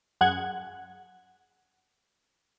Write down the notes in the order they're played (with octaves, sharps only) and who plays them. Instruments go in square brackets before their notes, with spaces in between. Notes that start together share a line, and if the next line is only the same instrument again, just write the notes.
[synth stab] F#2 G#4 F#5 F#6 G#6